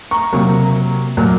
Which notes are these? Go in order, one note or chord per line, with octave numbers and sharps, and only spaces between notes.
A#5 C#6
C3 F#3 A#3
A#2 F#3 A#3